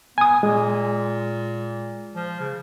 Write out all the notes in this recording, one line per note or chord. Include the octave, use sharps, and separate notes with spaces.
B3 G#5 D#6
A#2 G#3
F3
C#3